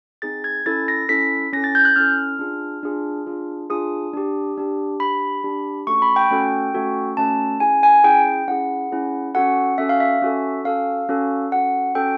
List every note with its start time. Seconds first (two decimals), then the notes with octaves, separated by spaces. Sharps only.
0.22 C4 D#4 G#4 A6
0.44 G#6
0.66 C#4 E4 A4 A6
0.88 A#6
1.09 C#4 E4 A4 B6
1.53 C#4 E4 A4 A#6
1.64 A6
1.75 G6
1.85 F#6
1.96 C#4 E4 A4 F6
2.39 D4 F4 G#4
2.83 D4 F4 G#4
3.26 D4 F4 G#4
3.70 D4 F4 G#4 D#6
4.13 D4 G4
4.58 D4 G4
5.00 D4 G4 B5
5.44 D4 G4
5.87 A3 C#4 F#4 A4 C#6
6.02 B5
6.16 G5
6.30 A3 C#4 F#4 A4
6.74 A3 C#4 F#4 A4
7.17 A3 C#4 F#4 A4 A5
7.60 C#4 E4 G#4 G#5
7.83 G#5
8.04 C#4 E4 G#4 G5
8.48 C#4 E4 G#4 F#5
8.92 C#4 E4 G#4
9.34 C#4 F#4 A4 F#5
9.78 C#4 F#4 A4 E5
9.89 F5
10.00 E5
10.22 C#4 F#4 A4
10.65 C#4 F#4 A4 F5
11.09 C#4 F#4 A4
11.52 C#4 F#4 A4 F#5
11.95 C#4 F#4 A4 G5